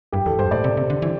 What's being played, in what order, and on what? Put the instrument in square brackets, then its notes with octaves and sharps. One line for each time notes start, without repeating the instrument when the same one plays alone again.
[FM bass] G2 [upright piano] G4
[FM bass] E2 [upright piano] A4
[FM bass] G2 [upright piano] C5
[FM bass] A2 [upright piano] D5
[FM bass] C3
C3
D3
E3